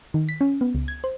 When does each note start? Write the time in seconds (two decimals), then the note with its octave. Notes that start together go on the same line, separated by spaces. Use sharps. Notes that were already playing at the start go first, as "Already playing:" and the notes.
0.14 D#3
0.29 B6
0.41 C#4
0.61 B3
0.75 C#2
0.88 G#6
1.04 C5